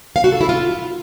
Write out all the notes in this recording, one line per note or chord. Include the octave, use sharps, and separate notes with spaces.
F5
F#4
A4
E4
F4